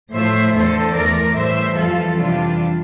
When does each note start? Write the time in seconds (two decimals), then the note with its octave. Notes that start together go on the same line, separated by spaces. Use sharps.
0.14 A2 F3 A3 C5 E5
0.55 E2 D3 A3 A4 C5
0.96 E2 E3 A3 A#4 D5
1.37 A2 E3 G3 C5 E5
1.78 F2 E3 G3 F4 A4
2.19 F2 C3 E3 G3 D4 F4